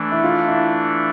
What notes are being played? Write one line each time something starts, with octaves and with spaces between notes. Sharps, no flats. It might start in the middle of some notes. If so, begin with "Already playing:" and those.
Already playing: E3 A3 D4
E4
F4
E4